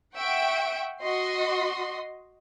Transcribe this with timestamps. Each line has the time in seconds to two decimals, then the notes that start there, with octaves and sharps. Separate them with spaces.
0.17 E5 F#5 G5 C#6 D7
1.02 F#4 D#5 C6